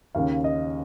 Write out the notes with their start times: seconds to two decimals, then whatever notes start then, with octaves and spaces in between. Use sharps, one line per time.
0.15 D#2 C#3 F5
0.44 D#5